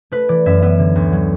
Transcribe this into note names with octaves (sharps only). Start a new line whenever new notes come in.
A3 B4
E3 D5
F#2 E5
B3 E5
D3
D2
F#3